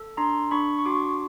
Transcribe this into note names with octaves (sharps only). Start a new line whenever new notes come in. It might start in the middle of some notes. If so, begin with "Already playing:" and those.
Already playing: A4
D4 A#5 C6
D4 B5 C#6
C#6
F#4 C6 D6